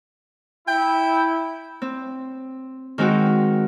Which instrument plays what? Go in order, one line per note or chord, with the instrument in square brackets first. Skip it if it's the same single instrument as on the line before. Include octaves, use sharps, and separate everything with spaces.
[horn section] E4 [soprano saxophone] G5
[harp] C4
D#3 G#3 C4 F#4